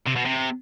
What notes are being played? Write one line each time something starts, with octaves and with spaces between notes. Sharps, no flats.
C3
B2
C3